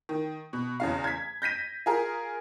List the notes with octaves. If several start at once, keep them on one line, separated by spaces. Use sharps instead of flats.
D#3
B2
E2 C#3 F5
G#6 B6
G6 A#6 B6 D#7
F4 G#4 A#4